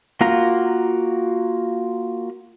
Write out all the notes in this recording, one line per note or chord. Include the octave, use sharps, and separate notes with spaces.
A#3 F4 F#4 F5 A#5